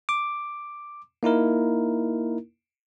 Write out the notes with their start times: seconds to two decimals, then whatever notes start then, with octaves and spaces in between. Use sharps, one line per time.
0.09 D6
1.23 A#3 D#4 E4 A#4